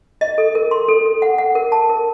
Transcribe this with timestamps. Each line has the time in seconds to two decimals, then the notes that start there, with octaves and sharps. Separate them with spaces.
0.21 D#5
0.38 A4
0.55 A#4
0.71 C6
0.88 A4
1.06 A4
1.22 F#5
1.38 F#5
1.55 A#4
1.72 A5
1.89 A#4